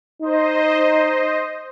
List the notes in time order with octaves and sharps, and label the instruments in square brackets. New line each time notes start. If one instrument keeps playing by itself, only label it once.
[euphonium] D#4 [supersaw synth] C5 D#5